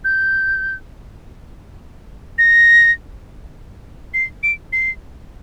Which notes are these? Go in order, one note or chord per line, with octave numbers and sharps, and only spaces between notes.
G6
A#6
C7
D7
C7